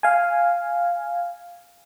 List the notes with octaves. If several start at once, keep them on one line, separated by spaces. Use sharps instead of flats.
F5 G#5